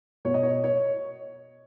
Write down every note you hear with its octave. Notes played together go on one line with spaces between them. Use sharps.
B2 C#5
D#5
C#5
C#5